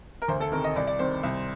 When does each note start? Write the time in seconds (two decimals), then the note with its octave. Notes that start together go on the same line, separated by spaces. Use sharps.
0.22 A#4
0.28 D2 C5
0.40 A4
0.52 C3 D#3 A#4
0.64 D#5
0.76 C2 D5
0.87 D5
0.99 C3 D#3 C5
1.23 C2